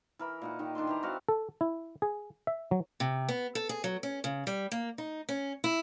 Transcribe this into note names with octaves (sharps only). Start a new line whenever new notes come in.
E3 A#4 B5
A#2 D#4 F#5
D#3 D#4 G4
D#3 D4 A4 C6
E3 G4 A#5
C4 F#4 D#5 F5
A4
E4
G#4
E5
F#3
C3
B3
A4
G#4
F#3
C#4
C#3
G3
A#3
D#4
C#4
E4